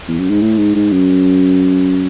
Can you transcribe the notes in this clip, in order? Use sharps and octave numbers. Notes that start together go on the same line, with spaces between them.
E2
F#2
G#2
A2
G#2
G#2
F#2